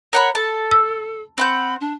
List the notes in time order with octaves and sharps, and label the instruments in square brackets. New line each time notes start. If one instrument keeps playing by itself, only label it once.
[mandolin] A#4 F#5 B5 [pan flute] C#5
[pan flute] A4 [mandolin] A5
[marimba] E6
[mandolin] C4 F#5 G6 [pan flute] B5
[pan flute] D4